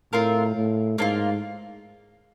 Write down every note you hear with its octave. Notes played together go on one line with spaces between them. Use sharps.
A2 C4 F4 A#4
A2
G#2 A#3 D4 F4